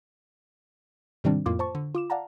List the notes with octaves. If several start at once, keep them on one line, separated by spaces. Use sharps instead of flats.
G#2 C3 D#3 G3 C4 D4
F2 A2 A#3 F4 D6
C5 A5 C#6
D3
F4 D6 E7
D5 F5 F#5 A5 A#5